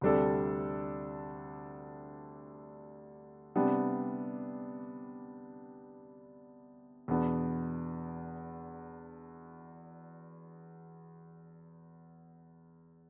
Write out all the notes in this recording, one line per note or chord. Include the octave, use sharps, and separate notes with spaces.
D2 C3 G3 D4 A4
C3 G3 B3 D4
E2 B2 B3 D4